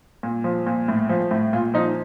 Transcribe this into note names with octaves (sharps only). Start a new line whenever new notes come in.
A#2
F3
A#2
A2
F3
A2
A#2 F4
F3 D#4